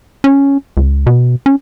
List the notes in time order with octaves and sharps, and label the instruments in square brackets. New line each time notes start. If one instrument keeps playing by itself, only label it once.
[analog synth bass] C#4
C#2
B2
C#4